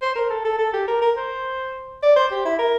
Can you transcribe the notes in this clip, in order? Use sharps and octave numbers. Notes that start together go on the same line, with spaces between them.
C5
A#4
A4
A4
A4
G4
A#4
A#4
C5
D5
C5
G4
E4
A#4